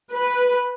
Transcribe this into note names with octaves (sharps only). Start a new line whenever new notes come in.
B4